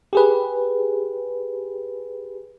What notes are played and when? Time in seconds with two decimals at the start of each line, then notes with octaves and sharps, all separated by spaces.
0.13 G4 G#4 B4